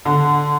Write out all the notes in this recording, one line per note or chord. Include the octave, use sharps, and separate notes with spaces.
D3